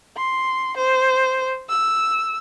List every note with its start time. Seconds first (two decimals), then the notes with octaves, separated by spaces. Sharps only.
0.17 C6
0.77 C5
1.69 E6